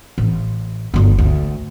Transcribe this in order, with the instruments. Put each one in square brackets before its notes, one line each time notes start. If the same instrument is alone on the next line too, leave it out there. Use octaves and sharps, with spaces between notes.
[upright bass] A1
G1 F#3
D2